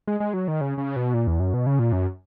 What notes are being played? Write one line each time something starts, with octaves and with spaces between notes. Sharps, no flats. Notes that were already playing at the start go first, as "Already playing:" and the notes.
G#3
G#3
F#3
D#3
C#3
C#3
B2
A#2
E2
F#2
B2
C#3
A#2
F#2